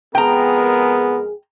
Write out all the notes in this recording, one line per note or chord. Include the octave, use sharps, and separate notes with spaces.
F2 G#3 B3 G#4 A#4 G5 A#5